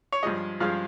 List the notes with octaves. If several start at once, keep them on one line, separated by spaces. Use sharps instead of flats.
C#5
G2 F3 G#3 D#5
G2 F3 G#3 F5